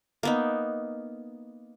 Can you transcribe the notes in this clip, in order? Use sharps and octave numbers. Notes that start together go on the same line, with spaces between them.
A#3 B3 D#4